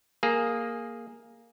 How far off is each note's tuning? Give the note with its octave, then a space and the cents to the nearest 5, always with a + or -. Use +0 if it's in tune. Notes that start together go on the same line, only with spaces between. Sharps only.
A#3 +0 G#4 +0